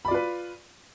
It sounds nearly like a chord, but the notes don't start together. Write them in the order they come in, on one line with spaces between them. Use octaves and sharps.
B5 D5 F4 B4